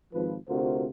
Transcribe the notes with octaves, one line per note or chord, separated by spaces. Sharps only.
G#1 F3 B4
D2 C3 F4 F#4 A#4 C5